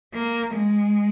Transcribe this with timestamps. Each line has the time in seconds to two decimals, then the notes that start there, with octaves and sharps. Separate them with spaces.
0.14 A#3
0.55 G#3